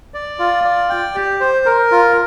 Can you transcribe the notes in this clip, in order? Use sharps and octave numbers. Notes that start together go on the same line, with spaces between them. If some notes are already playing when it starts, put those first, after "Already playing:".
D5
F4
D5
G5
G4
C5
A#4
F4